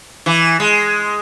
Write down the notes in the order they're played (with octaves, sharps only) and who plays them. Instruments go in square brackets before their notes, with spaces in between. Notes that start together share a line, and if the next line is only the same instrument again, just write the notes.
[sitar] E3
G#3